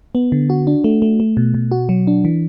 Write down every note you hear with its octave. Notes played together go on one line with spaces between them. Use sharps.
B3
D3
F#4
D4
A3
A3
A3
B2
B2
F#4
F#3
D4
E3